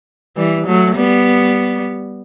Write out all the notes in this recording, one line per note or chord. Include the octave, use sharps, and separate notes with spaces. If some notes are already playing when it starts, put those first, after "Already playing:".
E3 G3
F#3 A3
G3 B3